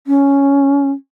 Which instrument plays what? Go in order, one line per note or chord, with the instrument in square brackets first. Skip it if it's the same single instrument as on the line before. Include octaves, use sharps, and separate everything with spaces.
[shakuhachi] C#4